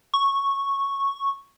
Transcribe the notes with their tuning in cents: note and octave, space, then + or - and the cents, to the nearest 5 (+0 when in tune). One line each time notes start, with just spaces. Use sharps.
C#6 -5